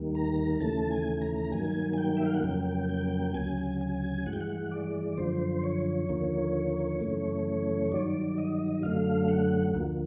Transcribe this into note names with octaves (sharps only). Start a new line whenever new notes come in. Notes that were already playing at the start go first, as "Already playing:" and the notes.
Already playing: D#2 D#3 G3 A#3
A#5
D#2 C#3 E3 A3 A5
G#5
A#5
G2 D#3 F#3 A#3 G#5
G#5
G5
E5
F5
F#5
F2 C#3 F#3 A#3 G5
G5
D2 C#3 F#3 G#5
G#5
G2 E3 G#3 F#5
G5
F#5
D5
F#2 D3 F3 C5
C#5
D#2 D3 F3 A#3
F#2 C#3 E3 A3
G2 D#3 F#3 D5
D#5
F#2 D3 F#3 A3 F5
F#5
D2 D3 F3 A#3